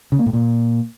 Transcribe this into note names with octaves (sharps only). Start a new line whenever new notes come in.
C#3
A#3
A2
A#2